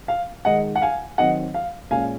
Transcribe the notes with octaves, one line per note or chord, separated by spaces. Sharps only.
F5
D#3 G#3 D#4 D#5 F#5
F#5
F5 G#5
D#3 F#3 C4 D#5 F#5
F5
A#2 G#3 C#4 F5 G#5